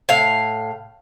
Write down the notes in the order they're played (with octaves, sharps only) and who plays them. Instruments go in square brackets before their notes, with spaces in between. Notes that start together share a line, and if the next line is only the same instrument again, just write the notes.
[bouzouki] A2 F5